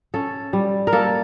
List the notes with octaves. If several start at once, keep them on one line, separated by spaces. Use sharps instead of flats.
C#4 A4
G3
A#4
A#3 A4